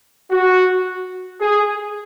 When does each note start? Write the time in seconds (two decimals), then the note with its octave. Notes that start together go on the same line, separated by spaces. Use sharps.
0.31 F#4
1.41 G#4